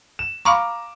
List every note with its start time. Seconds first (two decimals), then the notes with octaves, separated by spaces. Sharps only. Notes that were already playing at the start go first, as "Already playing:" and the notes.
0.19 E7
0.45 F5 A#5 B5 C#6 D6 F6